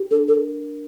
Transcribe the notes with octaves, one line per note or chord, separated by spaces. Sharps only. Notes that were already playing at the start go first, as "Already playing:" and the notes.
Already playing: G4
D4 A4
A4 A#4